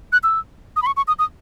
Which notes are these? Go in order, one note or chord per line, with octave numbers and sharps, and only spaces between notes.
F#6
E6
D#6
B5
C#6
C#6
D#6
D#6